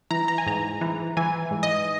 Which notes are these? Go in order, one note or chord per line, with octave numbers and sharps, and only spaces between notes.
E3 A#5
A#5
G#5
G#2 A#5
E3
E3 G#5
G#2
D#5